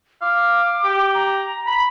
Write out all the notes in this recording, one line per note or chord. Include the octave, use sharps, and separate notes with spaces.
F5 D6
G4
A#5
B5